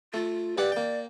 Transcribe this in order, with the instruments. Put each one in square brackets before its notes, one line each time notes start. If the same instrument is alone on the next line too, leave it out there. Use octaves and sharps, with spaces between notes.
[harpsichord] A3 [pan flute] F4
[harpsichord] G2 G4 F#5 [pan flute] D5
[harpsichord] A#3 G5